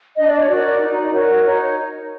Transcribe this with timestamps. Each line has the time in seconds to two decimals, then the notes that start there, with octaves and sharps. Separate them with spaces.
0.17 D4 D#5
0.28 D5
0.39 C#5
0.49 F#4 A#4 D5
0.81 D#4
1.12 F#4 A#4 C#5
1.44 D#4 C#5